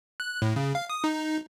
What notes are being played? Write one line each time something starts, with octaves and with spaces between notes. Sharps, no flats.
F#6
A2
C#3
F5
D#6
D#4